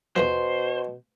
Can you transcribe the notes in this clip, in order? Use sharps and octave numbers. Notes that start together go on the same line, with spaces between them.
E2 B2 E3 F3 C5